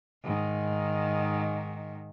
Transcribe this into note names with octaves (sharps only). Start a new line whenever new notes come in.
G#2 D#3